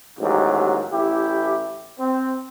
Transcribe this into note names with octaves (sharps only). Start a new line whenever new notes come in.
A1 D#2 G#2 F#3
A1 E4 G4
C4